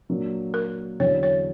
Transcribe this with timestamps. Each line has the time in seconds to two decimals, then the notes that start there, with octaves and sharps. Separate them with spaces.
0.09 A#2 F#3 A#3 D4
0.54 A#4
1.00 E2 D3 F#3 C#4 C#5
1.23 C#5